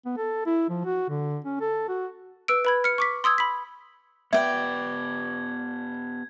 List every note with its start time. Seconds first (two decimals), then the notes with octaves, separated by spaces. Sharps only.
0.06 B3
0.17 A4
0.46 E4
0.69 F3
0.85 F#4
1.09 D3
1.45 C#4
1.61 A4
1.88 F#4
2.48 B4 E6 D7
2.65 B4 B5 G#6
2.84 F6 C#7
2.98 C#6 D6 B6
3.24 C6 D#6 E6 G#6
3.38 B5 B6
4.33 B3 G4 B4 D5 E5 G5 G#6